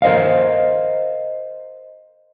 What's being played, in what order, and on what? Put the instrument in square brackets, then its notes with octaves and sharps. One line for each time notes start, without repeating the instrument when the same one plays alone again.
[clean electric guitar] A#4 C5 D#5 F5